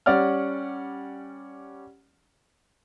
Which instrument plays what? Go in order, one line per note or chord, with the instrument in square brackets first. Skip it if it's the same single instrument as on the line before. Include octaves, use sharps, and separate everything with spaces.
[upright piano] G3 C#4 D5 F#5 F6